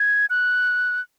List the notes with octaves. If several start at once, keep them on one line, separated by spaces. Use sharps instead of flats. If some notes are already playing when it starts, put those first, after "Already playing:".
Already playing: G#6
F#6